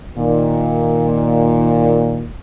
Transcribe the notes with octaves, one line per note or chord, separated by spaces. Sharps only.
A#2 D#3